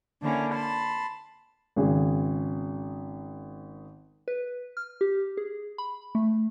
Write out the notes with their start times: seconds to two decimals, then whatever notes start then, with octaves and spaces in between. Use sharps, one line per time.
0.22 D3 A#3 C#4 E4 A#4
0.53 A5 B5 C6
1.76 G#1 C#3 G#4
4.28 B4
4.77 F6
5.01 G4
5.37 G#4
5.78 B5
6.15 A3